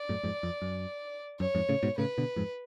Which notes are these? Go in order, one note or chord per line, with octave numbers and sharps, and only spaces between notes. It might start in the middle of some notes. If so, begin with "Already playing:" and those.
Already playing: D5
F#2 A2
F2 G#2
F2
F#2
F#2 C#5
F2 G#2
A2 C#3
G#2 B2
A2 C#3 B4
B2 D3
F2 G#2